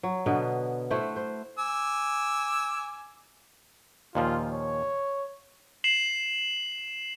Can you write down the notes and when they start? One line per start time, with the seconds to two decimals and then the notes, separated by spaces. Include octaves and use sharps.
0.03 F#3
0.26 B2 D3 B3
0.90 A3 E4 C5 F#5
1.16 C5
1.59 G#5 D6 E6
4.15 D#2 A#2 F3 F4
4.53 C#5
5.84 C7 E7 F#7